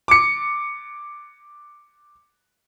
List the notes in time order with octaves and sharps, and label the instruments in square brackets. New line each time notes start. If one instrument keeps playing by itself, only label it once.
[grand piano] D6 C#7